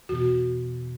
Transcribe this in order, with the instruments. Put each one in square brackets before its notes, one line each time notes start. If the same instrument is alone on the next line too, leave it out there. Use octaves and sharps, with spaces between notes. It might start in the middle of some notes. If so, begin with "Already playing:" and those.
[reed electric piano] E2 B2 [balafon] F#4